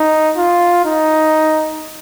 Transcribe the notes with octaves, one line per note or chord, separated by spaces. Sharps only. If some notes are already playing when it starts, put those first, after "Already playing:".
Already playing: D#4
F4
D#4